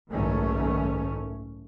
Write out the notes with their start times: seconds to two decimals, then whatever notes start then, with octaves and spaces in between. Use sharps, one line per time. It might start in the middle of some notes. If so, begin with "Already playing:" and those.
0.11 F#1 B1 G#2 D#3 A3 C#4